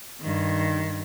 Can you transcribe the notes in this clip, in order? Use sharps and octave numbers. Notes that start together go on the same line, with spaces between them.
G2 D#3